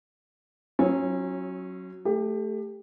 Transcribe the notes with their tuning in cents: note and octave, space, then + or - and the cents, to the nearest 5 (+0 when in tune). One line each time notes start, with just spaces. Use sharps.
F#3 +0 C#4 -25 F4 -40
A3 +0 G4 +25